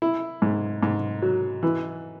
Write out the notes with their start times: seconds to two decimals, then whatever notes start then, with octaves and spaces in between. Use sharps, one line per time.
0.02 E4
0.42 G#2
0.83 G#2
1.22 F#3
1.63 E3